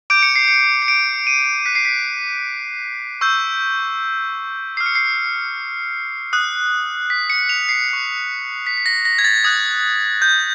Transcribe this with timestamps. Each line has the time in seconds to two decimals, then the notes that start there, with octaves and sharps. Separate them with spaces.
0.10 D6 G6 D7
0.23 C#7
0.36 C7
0.48 C#7
0.82 C#7
0.88 D7
1.27 D#7
1.66 D6 F#6 B6
1.75 C7
1.85 B6
3.21 C#6 E6 G6
4.77 D6 F6 C7
4.86 C#7
4.95 C7
6.33 D#6 F#6
7.10 B6
7.30 C#7
7.49 F7
7.69 C7
7.89 C#6 F#6
8.67 B6
8.77 B6
8.86 A#6
9.05 A#6
9.19 G#6
9.24 A6
9.44 D#6 F#6 G#6
10.22 G6